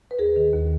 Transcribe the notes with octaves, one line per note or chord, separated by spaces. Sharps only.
B4
D#2 G#4 A#4
D#3
D#2